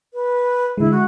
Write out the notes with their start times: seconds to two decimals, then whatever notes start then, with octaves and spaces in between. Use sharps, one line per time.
0.14 B4
0.78 D3 G#3 E4
0.92 F#4